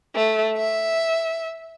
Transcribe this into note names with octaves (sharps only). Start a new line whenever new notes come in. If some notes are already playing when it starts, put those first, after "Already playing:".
A3
E5